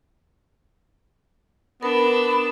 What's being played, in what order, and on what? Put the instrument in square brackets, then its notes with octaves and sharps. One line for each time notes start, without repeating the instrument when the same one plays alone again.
[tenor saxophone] B3 [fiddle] D4 E6 [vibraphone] A#4 [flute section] B5